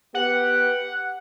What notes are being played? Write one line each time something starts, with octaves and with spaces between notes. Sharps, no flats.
B3 G4 B4 F#5